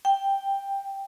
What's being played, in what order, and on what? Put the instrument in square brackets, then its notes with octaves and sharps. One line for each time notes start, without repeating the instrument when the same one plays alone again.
[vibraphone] G5